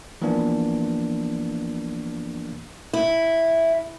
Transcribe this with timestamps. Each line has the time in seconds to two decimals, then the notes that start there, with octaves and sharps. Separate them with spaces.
0.22 E3 F3 A#3 B3 D4
2.93 E4